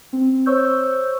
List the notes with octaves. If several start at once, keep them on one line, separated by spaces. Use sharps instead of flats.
C4
C5 C#5 C#6 E6 G6